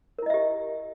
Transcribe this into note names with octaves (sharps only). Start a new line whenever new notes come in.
E4 G4 A#4 D#5 E5